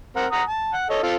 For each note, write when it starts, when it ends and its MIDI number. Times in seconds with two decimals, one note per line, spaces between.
0.16 0.26 60
0.16 0.26 70
0.16 0.26 78
0.32 0.42 78
0.32 0.42 82
0.32 0.42 87
0.48 0.73 81
0.74 0.85 78
0.90 1.00 69
0.90 1.00 73
0.90 1.00 75
1.03 1.16 60
1.03 1.16 65
1.03 1.16 69